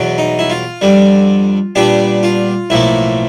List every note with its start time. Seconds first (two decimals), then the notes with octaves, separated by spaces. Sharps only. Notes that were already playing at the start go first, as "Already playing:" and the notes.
Already playing: E2 B2 F#3
0.18 D#4
0.39 E4
0.50 F4
0.81 F2 D3 G3
1.75 A#2 G3 B3 D4 G4
2.23 F4
2.70 B1 A2 F3 A#3 E4